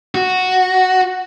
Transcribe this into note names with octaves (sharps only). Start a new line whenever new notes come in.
F#4